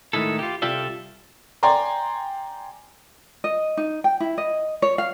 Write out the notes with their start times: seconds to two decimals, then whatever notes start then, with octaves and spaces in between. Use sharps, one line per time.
0.13 A2 D#3 G#3 E4 A4
0.39 F4 G4
0.62 C2 F4 G4 A4 D5 E5
1.63 D5 G5 G#5 A#5 C6
3.44 D#5
3.77 D#4
4.04 G5
4.20 E4
4.38 D#5
4.82 C#5
4.98 F5